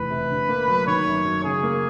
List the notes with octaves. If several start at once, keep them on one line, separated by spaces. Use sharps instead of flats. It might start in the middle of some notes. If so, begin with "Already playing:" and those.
Already playing: F1 E2 B4
C3
D3
A#3
F#3
D#3 C#5
F#2
F#3
C#3 G#4
A#3